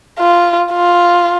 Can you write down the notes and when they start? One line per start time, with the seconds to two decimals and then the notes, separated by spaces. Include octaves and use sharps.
0.19 F4
0.73 F4